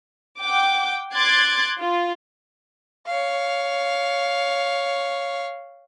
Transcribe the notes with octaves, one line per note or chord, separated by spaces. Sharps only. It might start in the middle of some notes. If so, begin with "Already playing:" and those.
F#5 G5 D6
C6 D6 F#6 G#6 A6
F4
C#5 F5